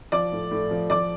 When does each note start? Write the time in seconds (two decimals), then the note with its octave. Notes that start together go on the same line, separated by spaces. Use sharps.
0.12 F3 D5 D6
0.32 A2
0.51 A2
0.71 F3
0.90 F3 D5 D6